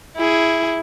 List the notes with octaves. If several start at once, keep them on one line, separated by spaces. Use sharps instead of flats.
E4 G#4